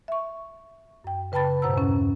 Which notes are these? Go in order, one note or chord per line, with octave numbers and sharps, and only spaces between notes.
E5 C#6
F#2 G5
C#3 B4 G5 A5 B5 A6
G2 B2 C5 F#5 A#5 E6
E2 C#4